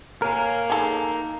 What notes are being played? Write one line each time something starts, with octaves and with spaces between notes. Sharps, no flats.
A2 A#3 A#4 C#5 G#5
D#4 G#4 A4